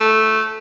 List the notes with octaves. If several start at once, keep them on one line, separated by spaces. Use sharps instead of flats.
A3